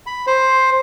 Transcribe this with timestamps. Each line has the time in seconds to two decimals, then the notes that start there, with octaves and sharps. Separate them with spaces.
0.06 B5
0.27 C5